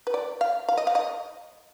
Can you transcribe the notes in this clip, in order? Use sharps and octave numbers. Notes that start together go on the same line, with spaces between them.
B4
D5
F5
F5
D#5
F5
D#5